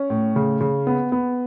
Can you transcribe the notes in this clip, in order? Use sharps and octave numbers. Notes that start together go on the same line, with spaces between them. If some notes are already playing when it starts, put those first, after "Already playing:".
Already playing: C#4
A2
C#3
C#3
B3
B3